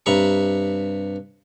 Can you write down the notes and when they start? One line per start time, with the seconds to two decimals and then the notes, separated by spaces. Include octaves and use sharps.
0.06 G2 C3 A#5 B5 C#6